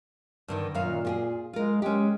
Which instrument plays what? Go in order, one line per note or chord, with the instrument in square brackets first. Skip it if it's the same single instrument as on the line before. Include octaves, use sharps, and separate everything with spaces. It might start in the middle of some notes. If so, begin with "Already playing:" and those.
[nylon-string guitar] G2 D3 D#3
[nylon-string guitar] F#2 D#3 F5 [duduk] A#2
[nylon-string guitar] F4 G4 G#4
[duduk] G#3 [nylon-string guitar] F4 A#4
[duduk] G#3 [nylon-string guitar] C#4 G4